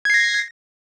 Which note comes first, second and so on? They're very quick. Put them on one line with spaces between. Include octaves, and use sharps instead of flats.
G#6 C7 A#6